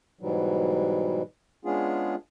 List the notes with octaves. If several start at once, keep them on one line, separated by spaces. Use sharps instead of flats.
G#2 B2 E3 F#3 G3
G#3 B3 C#4 D4 F4 G#4